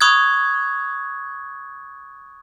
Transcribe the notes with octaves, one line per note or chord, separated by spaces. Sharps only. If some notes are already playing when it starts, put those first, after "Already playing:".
B5 C#6 D#6 F6 F#6 G#6